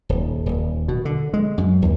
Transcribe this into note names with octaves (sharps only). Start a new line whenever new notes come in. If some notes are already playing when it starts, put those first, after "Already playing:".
D#1
D#1
B2
D3
G#3
F#2
D#2